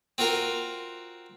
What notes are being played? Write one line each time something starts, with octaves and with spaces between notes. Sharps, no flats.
C4 F4 F#4 A#4 A#5